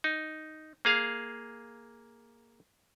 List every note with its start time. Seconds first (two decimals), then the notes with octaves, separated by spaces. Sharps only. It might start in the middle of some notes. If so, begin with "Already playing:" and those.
0.04 D#4
0.85 A#3 G#4 F5